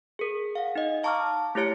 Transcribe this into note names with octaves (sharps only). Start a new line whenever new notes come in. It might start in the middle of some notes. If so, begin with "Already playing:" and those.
G#4 A#4
F5 F#5
D#4 D#5
F5 A5 A#5 C#6 D6 F6
A3 E4 G4 C#5 A5 C#7